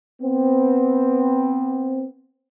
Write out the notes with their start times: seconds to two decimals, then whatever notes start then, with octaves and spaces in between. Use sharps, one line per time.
0.22 B3 C4